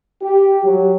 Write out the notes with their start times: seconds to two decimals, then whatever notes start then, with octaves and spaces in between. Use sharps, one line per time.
0.22 G4
0.65 F#3